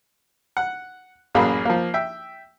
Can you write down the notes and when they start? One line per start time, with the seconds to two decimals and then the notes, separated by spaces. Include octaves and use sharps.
0.57 F#5
1.35 A1 F#2 F#3 A#3 G#4 B5
1.65 F3 A#3
1.94 E5 G5